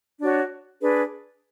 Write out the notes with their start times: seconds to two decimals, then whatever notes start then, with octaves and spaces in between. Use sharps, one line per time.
0.20 D4 F#4 C#5
0.80 D4 G#4 B4